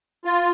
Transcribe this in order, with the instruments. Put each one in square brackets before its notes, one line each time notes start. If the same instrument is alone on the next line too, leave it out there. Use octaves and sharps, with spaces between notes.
[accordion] F4